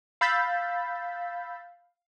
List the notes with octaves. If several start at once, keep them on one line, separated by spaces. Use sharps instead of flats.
F5 B5 E6 G6 A6 B6